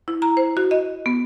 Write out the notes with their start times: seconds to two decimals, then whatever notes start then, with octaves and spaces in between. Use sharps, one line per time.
0.08 E4
0.22 A#5
0.37 C5
0.57 F#4
0.71 D#5
1.06 B3